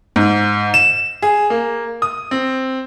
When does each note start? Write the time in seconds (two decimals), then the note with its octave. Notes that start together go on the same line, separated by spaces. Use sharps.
0.16 G#2
0.74 E7
1.22 G#4
1.50 A#3
2.02 D#6
2.31 C4